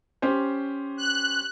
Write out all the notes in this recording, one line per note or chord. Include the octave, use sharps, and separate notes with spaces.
C#4 G4 C5
F#6